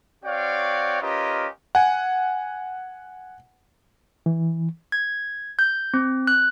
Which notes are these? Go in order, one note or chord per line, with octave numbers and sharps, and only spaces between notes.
C4 F#4 C#5 D5 F5 G5
C#4 F4 G4 A#4 B4 D#5
F#5 G#5
E3
G#6
G6
C4
F#6